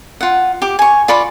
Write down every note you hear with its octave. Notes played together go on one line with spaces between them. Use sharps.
F4 F#5
G4 D6
G#5 C#6
F4 D5 B5 C#6